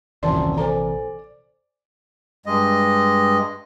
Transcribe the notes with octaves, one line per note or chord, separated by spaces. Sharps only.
D#1 A#1 F#2 C3 E3 D5 A5 C6
A4 C5 D5 G#5 A#5
G2 G#3 D#5